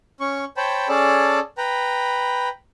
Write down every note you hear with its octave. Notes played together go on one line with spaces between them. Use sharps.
C#4 C#6
C5 C#5 G5 A5 B5
C#4 G#4 A4 D5 A5
B4 G5 A#5 B5